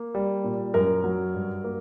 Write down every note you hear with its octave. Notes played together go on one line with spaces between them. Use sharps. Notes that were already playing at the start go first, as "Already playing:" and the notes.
Already playing: A#3
G3
A#2
F#2 A#4
F#3
G2
A#3